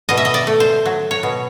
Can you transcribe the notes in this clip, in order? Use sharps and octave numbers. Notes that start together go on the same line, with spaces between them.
B2 D#5
E5
D#5
D5
A3
C5
F#3
C#5
B2